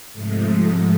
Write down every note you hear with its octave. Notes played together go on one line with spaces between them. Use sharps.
G#2 C3 F3 G#3 A3